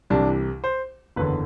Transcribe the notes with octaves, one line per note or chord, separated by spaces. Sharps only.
C2 C3 E3 D4
C5
F#1 E2 D3 B4